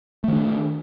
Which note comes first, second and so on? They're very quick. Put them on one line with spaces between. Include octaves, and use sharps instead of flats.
A3 D#3 D4